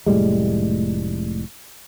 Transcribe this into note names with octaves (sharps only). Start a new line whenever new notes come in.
F1 A2 G3 G#3